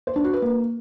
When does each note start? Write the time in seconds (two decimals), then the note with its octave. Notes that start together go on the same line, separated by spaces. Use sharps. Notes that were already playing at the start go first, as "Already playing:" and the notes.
0.07 C5
0.16 D4
0.25 F#4
0.33 B4
0.42 A#3